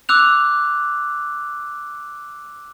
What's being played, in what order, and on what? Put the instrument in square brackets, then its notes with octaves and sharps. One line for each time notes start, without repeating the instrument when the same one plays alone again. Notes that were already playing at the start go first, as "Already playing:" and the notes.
[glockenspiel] D6 E6 F#6 F7